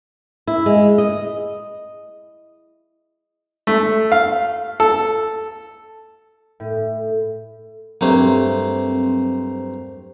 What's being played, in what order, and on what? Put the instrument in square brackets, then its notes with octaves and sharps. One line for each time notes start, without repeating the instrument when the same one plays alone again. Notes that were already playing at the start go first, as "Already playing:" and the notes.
[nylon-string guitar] E4
G#3
D#5
[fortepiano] A3
F5
A4
[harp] A2
[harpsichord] G2 A3 A#3 [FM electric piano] F#3 C4 C5